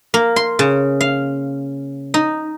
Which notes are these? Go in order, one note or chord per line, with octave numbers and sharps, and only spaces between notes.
A#3
C6
C#3
F5
D#4